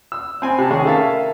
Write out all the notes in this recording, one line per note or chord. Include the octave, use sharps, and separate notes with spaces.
E6
C4 G#5
C3 A5
C3 D#3 C#4 G#4
A4 A#4 E5 F5 A5